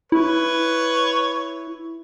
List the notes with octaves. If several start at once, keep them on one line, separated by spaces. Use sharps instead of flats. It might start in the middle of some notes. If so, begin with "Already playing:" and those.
E4 B4 C#5